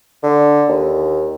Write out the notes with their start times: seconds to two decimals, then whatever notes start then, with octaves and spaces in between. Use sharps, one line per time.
0.23 D3
0.68 D#2